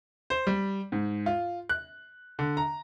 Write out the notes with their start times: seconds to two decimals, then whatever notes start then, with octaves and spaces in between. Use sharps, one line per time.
0.30 C5
0.47 G3
0.92 G#2
1.26 F4
1.69 F#6
2.39 D3
2.57 A#5